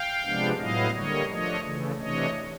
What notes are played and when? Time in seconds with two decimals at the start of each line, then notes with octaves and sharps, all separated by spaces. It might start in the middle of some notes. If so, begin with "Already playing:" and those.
Already playing: F5 G5
0.25 C3 F3 G#3 B3 D4
0.59 A2 F#3 B3 E4 D#5 F5
0.94 D3 G3 A#3 C#5 D#5
1.29 F3 A3 D4 C#5 D#5
1.64 C#3 E3 A3
1.99 C3 E3 A3 D4 C#5 D#5